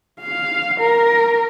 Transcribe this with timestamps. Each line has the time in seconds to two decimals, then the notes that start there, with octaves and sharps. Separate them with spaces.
0.22 F5
0.80 A#4